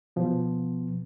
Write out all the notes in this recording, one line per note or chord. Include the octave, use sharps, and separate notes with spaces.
B2 F3 B3